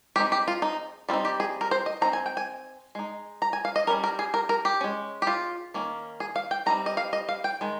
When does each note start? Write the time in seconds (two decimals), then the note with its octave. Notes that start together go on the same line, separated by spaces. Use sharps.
0.16 G#3 C4 D#4 G4
0.32 G4
0.48 F4
0.62 D#4
1.09 G3 C4 D#4 F4
1.25 G4
1.40 G#4
1.61 A#4
1.71 C5
1.86 D#5
2.01 F3 C4 D#4 A#5
2.13 G#5
2.26 G5
2.37 G#5
2.95 G#3 D#4
3.42 A#5
3.53 G#5
3.65 F5
3.76 D#5
3.87 G3 C#4 A#4
4.04 A#4
4.19 G#4
4.34 A#4
4.49 A#4
4.65 G4
4.81 G#3 C#4
5.22 G4
5.27 F4
5.74 D#3 A#3 C#4
6.20 G#4
6.36 F5
6.51 G5
6.66 D#3 G3 C4 D#4 A#5
6.86 D#5
6.97 F5
7.13 D#5
7.29 F5
7.44 G5
7.61 D#3 G#3